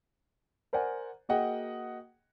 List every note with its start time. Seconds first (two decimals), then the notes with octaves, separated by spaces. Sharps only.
0.73 A#4 C5 D5 F#5 G#5
1.29 A#3 F#4 G#4 D#5 F#5 G5